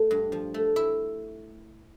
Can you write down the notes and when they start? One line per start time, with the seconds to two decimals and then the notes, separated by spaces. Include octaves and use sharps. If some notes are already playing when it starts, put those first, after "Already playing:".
Already playing: A3 A4
0.11 G2
0.32 F3
0.54 A3
0.76 E4 E5